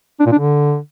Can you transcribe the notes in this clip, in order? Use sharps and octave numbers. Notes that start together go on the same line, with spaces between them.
D4
A#2
D4
D3